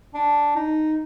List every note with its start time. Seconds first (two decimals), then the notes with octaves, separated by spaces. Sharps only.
0.14 D4
0.56 D#4